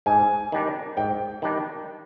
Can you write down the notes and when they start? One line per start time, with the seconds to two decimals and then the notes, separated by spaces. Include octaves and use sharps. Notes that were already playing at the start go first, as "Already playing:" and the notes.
0.06 G#2 G#5
0.52 D#3 G3 D4
0.97 G#2 G5
1.42 D#3 G3 D4